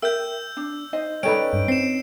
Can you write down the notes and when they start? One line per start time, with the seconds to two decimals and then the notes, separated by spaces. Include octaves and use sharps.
0.02 A#4 E5 G5 E6 G6
0.57 D4
0.93 D#4 C5 D#5
1.23 C#4 D#4 G4 A4 B4 D5 D7
1.53 G2
1.68 C4 C7 E7